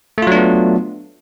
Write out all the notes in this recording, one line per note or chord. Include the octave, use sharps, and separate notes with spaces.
F#3 A3 B3 D4 F4